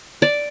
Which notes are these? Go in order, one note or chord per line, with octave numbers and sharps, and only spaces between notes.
D5